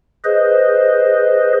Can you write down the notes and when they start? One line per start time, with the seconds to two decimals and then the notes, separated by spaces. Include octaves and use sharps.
0.24 G#4 B4 C5 D#5